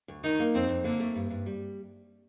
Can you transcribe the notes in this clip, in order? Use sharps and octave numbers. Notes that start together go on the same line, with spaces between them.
D2
D#3 D#4
A#3
F2 C4
F2
D3 A#3
A3
G2
G2
G3